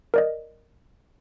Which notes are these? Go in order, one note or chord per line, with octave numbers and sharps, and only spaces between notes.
A#4 D5 D#5